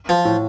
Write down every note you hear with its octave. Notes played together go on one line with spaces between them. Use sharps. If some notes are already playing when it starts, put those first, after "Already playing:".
F3
A2